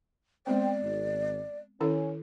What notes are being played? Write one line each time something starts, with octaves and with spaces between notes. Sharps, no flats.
G#3 B3 C4 C5 D5 G5
G#1
D#3 C#4 E4 A4